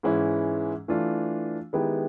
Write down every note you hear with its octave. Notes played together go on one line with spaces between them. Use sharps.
G#2 E3 G#3 C#4 E4
E3 A3 D4 F4
D#3 G#3 B3 E4 G4